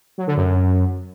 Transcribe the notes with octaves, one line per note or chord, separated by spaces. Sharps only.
F#3
D3
F#2